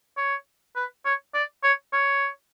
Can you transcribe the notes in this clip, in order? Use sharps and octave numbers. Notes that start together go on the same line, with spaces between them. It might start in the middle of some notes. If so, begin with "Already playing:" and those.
C#5
B4
C#5
D5
C#5
C#5